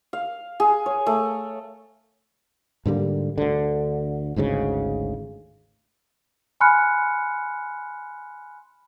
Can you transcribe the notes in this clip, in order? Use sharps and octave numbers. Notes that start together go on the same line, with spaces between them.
F5
G#4
C#5
A3
G#2 D3 G3 A#3
D2 D3
G#1 D2 G#2 C#3
G#5 B5 C6 F6 F#6 C#7